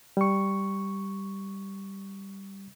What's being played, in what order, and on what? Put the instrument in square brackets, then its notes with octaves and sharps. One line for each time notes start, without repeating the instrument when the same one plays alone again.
[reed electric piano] G3 C#6